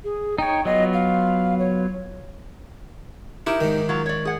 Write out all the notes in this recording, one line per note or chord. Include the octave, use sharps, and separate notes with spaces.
G#4
D#4 C#5 G5
F#3 B3 F4 D#5
F5
C#5
D#4 E4 G4 A#4
G#2 D#3
F#3 F4 A#5
C#5 D5
G#4 F#5